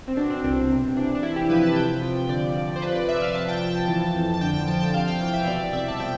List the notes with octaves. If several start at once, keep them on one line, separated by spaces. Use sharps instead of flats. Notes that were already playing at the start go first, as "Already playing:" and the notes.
C4
B2 D4
C4
C2 D4
C3
E3 D4
D4
C3 E4
G4
F3 B4
A5
C3 G5
G5
F3 G5
G5
D3 D5
F3
C5
C3 B4
D5
F3 E5
F5
C3 A5
G5
F3 G5
A5
E3
F2
A5
D3 G5
G5
F3 A5
G5
C3 F5
G5
E3 G5
F5
E5
B2 D5
C2 E5
A5
F3 G5